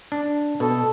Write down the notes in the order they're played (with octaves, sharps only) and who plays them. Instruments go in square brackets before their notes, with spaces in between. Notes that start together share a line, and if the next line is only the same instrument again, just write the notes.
[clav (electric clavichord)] D4
[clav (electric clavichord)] B2 [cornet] A4